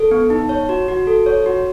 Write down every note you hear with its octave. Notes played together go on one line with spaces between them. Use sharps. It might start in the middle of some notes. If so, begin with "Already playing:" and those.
Already playing: A4
B3
D#4
C#5
F#4
F#4
A4
C#5
F#4